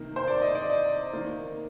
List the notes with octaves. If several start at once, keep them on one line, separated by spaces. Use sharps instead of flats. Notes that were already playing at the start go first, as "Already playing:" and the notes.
Already playing: C3 D#3 A#3
C5
D5
D#5
D5
D#5
D#3 A#3